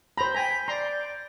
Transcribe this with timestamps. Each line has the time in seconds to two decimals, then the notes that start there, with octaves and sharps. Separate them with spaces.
0.17 C5 A#5 B5 G6
0.35 G5 G#5 A#5 B6
0.68 D5 A#5 C6